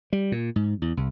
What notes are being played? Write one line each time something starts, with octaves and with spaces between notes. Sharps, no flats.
G3
A#2
G#2
E2
C2